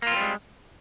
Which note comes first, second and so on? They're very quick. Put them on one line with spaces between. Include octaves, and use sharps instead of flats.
A#3 F4 C4 G3 G#3